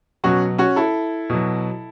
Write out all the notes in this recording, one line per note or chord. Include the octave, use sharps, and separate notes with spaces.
B2 F#3 C#4 F#4
C#4 F#4
E4 A4
B2 F#3